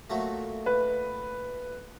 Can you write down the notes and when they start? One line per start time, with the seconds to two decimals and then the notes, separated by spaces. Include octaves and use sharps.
0.10 A#2 F#3 A3
0.66 B4